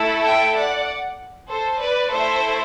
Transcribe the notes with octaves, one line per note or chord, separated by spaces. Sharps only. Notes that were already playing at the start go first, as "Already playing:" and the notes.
Already playing: A3 E4 A4
E5 G5
D5 F#5
A4 C5
B4 D5
A3 E4 A4 C5 E5